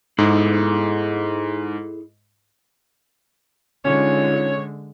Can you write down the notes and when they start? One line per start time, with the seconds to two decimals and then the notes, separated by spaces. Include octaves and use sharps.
0.18 G#2 E4 G#4 A4
3.85 D3 G#3 C#4 D#4 F4 C#5